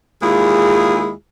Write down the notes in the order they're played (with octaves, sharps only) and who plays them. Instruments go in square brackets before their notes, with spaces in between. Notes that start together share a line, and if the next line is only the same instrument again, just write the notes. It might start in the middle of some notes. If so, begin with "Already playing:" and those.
[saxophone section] D#2 G#3 E4 F4 G#4